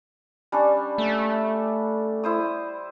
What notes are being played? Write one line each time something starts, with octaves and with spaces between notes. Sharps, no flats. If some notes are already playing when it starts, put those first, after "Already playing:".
G3 C#4 D4
A3
E4 C5 D#6